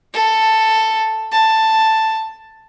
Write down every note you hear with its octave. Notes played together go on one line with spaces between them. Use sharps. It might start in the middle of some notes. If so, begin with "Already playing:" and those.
A4
A5